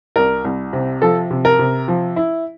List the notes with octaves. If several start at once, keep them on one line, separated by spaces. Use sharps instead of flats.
C2 A#4
C2
C3
F3 A4
C3
A#4
C3
F3
E4